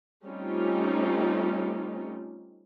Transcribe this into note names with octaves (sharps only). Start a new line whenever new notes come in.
G3 A3 C4 C#4 D#4 F4